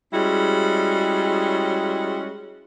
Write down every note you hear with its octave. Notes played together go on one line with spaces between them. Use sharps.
G3 G#3 C#4 E4 F#4